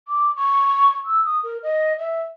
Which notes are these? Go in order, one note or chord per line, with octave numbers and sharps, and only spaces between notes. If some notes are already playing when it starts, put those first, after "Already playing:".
D6
C#6
E6
D#6
A#4
D#5
E5